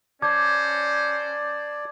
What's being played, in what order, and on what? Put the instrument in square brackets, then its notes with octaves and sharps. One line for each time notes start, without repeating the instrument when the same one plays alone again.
[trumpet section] C#4 C5 [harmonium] D5 [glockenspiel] A5 D6 G#6